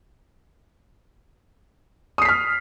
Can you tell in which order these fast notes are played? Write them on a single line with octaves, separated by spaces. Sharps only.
D#6 C7 B6 F6